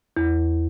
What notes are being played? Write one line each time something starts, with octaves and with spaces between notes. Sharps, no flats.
E2